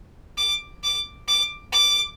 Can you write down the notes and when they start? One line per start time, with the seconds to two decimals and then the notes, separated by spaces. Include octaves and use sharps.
0.37 D6
0.83 D6
1.28 D6
1.72 D6